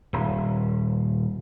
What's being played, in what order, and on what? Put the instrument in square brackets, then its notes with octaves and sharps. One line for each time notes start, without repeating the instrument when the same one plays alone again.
[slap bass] D#1